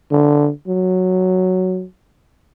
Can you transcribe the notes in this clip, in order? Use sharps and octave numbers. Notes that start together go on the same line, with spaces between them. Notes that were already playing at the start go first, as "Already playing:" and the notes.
D3
F#3